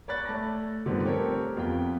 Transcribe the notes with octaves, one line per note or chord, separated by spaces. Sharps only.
C#5 D5 B5 F#6 A6
A3 A5 A#6
G2 D3 D#3 F3 B3 C4
A3 C4 G4 A4 A#4 C#5
F2 B3 F4 G5